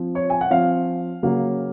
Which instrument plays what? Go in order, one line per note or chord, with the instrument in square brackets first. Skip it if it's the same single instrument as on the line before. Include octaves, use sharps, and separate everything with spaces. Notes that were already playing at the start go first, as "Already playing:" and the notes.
Already playing: [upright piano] F3 C4
C#5
G#5
F#5
F3 C4 F5
C#3 F#3 A#3 C#4